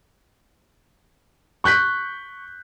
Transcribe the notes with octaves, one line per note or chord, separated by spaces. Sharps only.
C#6 F#6 G6 B6